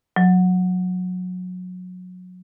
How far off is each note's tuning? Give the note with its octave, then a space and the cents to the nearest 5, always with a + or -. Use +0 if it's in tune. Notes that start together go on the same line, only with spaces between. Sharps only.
F#3 -25